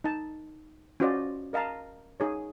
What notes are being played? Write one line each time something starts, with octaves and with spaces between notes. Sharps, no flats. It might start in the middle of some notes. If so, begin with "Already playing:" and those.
D#4 A5
C#4 F4 F#4 C5 D5 D#5
A#4 D#5 F5 A5 A#5
D#4 G#4 C#5